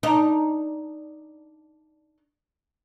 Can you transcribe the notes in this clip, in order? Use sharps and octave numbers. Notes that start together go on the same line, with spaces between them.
D4 D#4